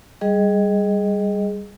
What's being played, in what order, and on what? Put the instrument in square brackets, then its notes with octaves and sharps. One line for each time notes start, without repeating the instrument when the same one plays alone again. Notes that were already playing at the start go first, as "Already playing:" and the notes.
[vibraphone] G3 G#4 D#5